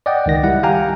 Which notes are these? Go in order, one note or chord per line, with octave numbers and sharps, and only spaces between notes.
D5 D#5 F#5 G5
C#2 D#3 A#6
G3 E4 F#5
G4 F5 G5 G#5 A#5